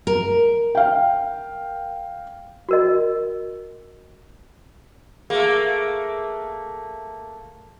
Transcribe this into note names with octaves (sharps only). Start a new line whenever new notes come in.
A#4
F5 G5
F#4 A#4 D#5
A3 A#3 G#4